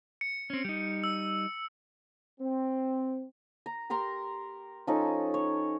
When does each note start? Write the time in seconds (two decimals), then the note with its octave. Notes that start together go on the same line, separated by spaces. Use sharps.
0.21 C#7
0.50 C4 C#4
0.65 G3 D#4
1.04 E6
2.40 C4
3.66 A#5
3.90 G4 A#4 A#5 C6
4.87 F3 C#4 D#4 A4
5.34 C#5